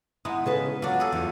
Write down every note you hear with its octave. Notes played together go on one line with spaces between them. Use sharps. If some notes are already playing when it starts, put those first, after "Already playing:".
G#3 B3 D#4 E4
C#3 A4 B4
F#3 D4 F4
G#4 A4
E2 F#3 F4